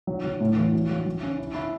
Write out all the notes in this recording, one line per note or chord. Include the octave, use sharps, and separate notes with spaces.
F#3
F#3
A2
E3
F#3
F#3
F#3
C#4
E4
E4